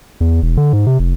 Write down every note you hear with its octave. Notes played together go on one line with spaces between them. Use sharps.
E2
E1
D3
G#2
C3
F1